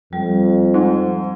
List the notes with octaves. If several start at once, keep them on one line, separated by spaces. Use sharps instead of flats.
F2 G3
G#2